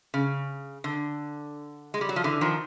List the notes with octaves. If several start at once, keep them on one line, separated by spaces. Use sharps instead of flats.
C#3
D3
G#3
G3
F#3
F3
D3 E3
D#3 F3